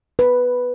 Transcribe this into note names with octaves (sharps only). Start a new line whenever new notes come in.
B4